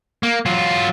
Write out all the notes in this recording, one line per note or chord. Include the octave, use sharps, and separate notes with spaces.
A#3
F#3 F4